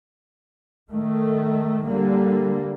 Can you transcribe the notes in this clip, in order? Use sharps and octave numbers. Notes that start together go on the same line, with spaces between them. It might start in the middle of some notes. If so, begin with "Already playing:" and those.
D#3 A3
D3 G3 A#3